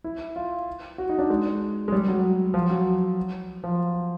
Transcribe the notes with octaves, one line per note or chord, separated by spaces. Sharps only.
E4
F4
F#4
D#4
D4
G#3
G#3
G3
F#3
F3
F#3
F3